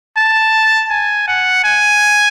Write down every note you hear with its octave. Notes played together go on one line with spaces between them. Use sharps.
A5
G#5
F#5
G#5